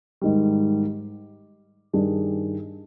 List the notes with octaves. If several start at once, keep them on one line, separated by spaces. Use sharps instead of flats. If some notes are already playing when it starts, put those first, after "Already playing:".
G#2 D#3 G3
G2 D#3 G3 D4 G#4